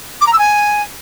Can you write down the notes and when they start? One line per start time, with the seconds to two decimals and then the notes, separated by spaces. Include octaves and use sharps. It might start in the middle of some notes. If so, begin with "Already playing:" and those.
0.21 D6
0.27 A#5
0.33 E6
0.39 G#5